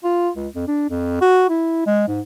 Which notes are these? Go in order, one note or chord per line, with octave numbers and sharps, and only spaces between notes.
F4
C#2
F2
D4
F2
F#4
E4
G#3
G#2